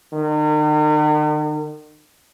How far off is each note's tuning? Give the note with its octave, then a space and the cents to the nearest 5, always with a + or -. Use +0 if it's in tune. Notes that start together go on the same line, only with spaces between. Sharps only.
D#3 -45